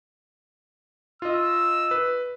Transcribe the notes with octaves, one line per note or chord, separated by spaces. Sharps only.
F4 D#5 E6
B4